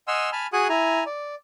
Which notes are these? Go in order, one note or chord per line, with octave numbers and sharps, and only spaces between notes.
D#5 F#5 G#5 C6 E6 F6
G#5 A5 B5 F6
F#4 G#4 F#5 G#5 D#6 F#6
E4 G#5 A#5
D5